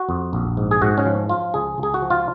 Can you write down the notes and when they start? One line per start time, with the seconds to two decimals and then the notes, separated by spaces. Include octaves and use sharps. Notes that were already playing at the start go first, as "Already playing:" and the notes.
Already playing: F#4
0.09 F2
0.33 A#1
0.57 G#2
0.71 G#4
0.81 G#2 F#4
0.98 C#4
1.06 F3
1.29 F3 F4
1.54 C#2 G#4
1.78 C#2
1.83 G#4
1.94 F#4
2.02 F3
2.10 F4